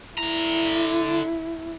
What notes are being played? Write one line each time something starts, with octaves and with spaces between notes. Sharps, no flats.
D3 E4 A#5